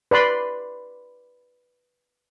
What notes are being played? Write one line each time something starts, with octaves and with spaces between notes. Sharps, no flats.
B4 D5 B5 C6